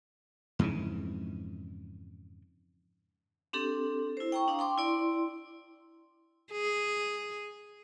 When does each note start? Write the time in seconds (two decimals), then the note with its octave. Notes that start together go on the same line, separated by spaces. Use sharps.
0.59 F2 G#2 C#3 E3
3.53 C4 D4 G4 A4
4.17 E4 C5
4.32 G5 A#5 C#6
4.48 D4 F5 A#5 D#6
4.59 G5 C6 D6
4.78 E4 D5 C6
6.52 G#4